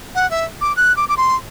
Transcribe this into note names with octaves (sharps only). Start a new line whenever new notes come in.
F#5
E5
D6
F#6
D6
D6
C6